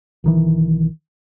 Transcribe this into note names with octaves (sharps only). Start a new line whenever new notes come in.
B1 D#3 E3